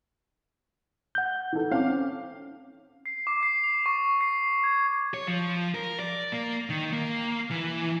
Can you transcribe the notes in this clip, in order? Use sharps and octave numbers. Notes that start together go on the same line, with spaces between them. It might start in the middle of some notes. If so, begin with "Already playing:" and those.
F#5 G6
E3 D#4 A4
C4 C#4 F5 G5 D6
C7
D6
C7
F7
C#6
C7
G#6
C#5
F3
A#4
D5
A#3
D#3
A#3
E3